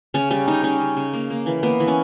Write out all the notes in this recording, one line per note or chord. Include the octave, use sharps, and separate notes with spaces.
C#3 C#4
G3 C#4
C#3 D#4
G3 C#4
C#3
C#3
A#3
A#3
E3
A#3 B3
E3
C#4